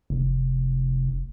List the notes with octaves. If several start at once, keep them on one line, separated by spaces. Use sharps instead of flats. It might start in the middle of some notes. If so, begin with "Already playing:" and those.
F1